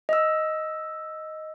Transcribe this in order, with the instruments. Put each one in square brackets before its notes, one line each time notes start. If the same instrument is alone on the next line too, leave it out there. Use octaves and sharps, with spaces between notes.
[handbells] D#5 E6